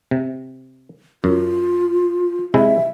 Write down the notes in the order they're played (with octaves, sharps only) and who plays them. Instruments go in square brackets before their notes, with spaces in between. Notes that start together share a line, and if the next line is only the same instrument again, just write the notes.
[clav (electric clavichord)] C3
[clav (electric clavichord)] F#2 [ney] F4
[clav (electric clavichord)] C3 G#3 E4 [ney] E5